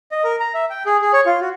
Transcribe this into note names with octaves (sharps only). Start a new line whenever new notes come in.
D#5
A#4
A#5
E5
G5
G#4
G#4
C#5
F4
F#4